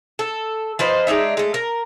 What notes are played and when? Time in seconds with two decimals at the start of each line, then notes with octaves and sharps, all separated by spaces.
0.19 A4
0.79 F3 B4 C5 D#5
1.07 G#3 D4 D#4 E5
1.37 G#3 A3
1.54 A#4